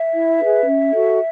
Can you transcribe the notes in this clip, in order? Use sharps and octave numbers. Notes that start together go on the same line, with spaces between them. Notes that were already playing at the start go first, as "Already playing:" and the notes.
Already playing: E5
E4
G#4 B4
C#4
F#4 A4